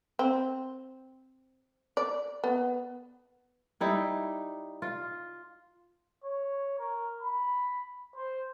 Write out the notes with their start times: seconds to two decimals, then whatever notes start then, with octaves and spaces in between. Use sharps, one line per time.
0.19 C4
1.97 D5
2.44 B3
3.80 G3 D#4 E4
4.82 F4
6.24 C#5
6.79 A#4
7.22 B5
8.16 C5